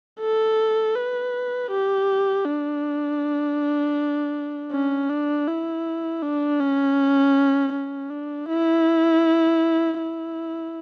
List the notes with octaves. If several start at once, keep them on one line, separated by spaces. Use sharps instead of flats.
A4
B4
G4
D4
C#4
D4
E4
D4
C#4
C#4
D4
E4
E4